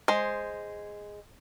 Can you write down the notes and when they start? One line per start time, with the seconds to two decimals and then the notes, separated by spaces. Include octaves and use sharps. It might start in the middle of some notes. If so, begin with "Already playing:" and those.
0.08 G#3 C5